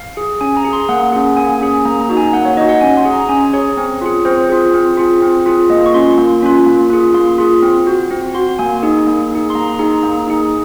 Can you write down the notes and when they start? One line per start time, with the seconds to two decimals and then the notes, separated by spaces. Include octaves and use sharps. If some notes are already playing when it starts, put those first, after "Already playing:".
Already playing: F5
0.17 G#4
0.41 C#4 G#5
0.57 A#5
0.65 G#4
0.73 C6
0.89 A#3 F#5
1.13 C#4 G#4
1.37 A#3 G#5
1.61 C#4 G#4
1.85 A#3 A#5
2.01 A#5
2.09 D#4 F#4
2.17 G#5
2.33 A#3 F#5
2.45 C#5
2.57 D#4 F#4 D#5
2.69 F#5
2.81 C#4 G#5
2.97 C6
3.05 G#4
3.13 A#5
3.29 C#4 G#5
3.53 G#4 C#5
3.77 C4
4.02 F4 G#4
4.25 C4 C5
4.49 F4 G#4
4.74 C4
4.97 F4 G#4
5.22 C4
5.46 F4 G#4
5.70 A#3 D#5
5.86 C#6
5.94 C#4 F4 C6
6.18 A#3
6.42 C#4 F4
6.66 A#3
6.90 F4 G#4
7.14 A#3 C6
7.38 F4 G#4
7.63 C4
7.87 F#4
8.11 C4
8.35 F#4 C6
8.59 A#3 G#5
8.83 D#4 G#4
9.07 A#3
9.31 D#4 G#4
9.50 C6
9.55 A#3 A#5
9.79 D#4 G#4 A#5
10.03 A#3
10.27 D#4 G#4